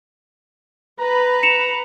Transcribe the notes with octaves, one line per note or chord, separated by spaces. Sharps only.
B4 A#5
C#7 E7 F7